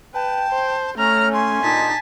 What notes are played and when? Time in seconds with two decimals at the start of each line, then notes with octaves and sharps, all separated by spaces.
0.14 B4 G5 A5
0.49 C5
0.98 A3 C#4 A#5 F6
1.34 G#5 C6
1.63 A#2 D4 D#4 A5 B6